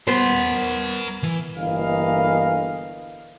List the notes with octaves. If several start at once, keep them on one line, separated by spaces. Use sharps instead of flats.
B3 A#4 C5 F#5
E3
G1 E3 A#3 D#5 F5